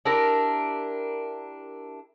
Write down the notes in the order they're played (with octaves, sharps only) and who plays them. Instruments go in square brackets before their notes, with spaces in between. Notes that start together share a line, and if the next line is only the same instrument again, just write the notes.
[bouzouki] D4 E4 G4 A#4